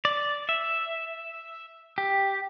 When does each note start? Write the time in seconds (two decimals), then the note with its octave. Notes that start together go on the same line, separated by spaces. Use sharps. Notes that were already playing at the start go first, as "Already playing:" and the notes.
0.05 D5
0.49 E5
1.98 G4